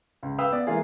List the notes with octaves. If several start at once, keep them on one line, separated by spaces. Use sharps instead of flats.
C#2
B4 F5 G5 D#6 E6
B3 D5
E3 G#3 A#3 F4 G#4